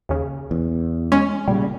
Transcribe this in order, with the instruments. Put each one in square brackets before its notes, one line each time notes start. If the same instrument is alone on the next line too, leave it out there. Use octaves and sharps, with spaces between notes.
[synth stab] D#2 C#3
[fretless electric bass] E2
[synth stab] G#3 [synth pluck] C#4
[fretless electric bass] A#2 C#3 [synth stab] G3